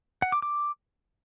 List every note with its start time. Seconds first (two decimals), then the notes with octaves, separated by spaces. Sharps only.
0.22 F#5
0.32 D6
0.42 D6